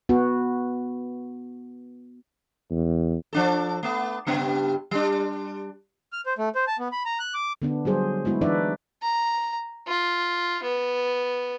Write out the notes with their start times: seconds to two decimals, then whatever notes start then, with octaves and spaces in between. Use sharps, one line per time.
0.09 B3 F#4
2.71 E2
3.33 F3 D4 A4
3.83 A3 B3
4.27 G2 C#3 B3
4.91 G3 D4
6.13 F6
6.26 C5
6.38 A3
6.55 C5
6.67 A5
6.79 B3
6.92 B5
7.05 A#5
7.19 F#6
7.34 D6
7.62 D3 B3 D4
7.85 F#3 G3 G#4 C5
8.25 G#3 B3 E4 F#4
8.41 E3 D4 D#4 B4 D5 E5
9.03 A#5
9.88 F4
10.63 B3